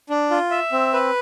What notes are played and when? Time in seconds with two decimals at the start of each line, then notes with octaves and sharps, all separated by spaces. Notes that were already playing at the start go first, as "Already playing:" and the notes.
0.09 D4
0.31 F4
0.51 E5
0.72 C4
0.93 B4